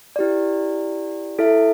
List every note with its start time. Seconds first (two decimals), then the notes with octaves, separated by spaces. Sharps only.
0.16 E4 G4 D5
1.39 E4 A4 E5